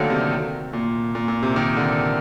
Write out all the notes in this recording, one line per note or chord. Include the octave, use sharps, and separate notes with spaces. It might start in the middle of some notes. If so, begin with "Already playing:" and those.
Already playing: D3 D#3 F#3 A3 A#3
C3
A#2
A#2
A#2
C3
D#3
D3